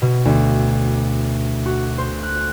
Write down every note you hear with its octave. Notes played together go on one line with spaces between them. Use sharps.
B2
D2
F#4
C5
F#6